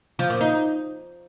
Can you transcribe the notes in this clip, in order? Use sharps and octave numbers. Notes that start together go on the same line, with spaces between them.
F3
A#2
D#4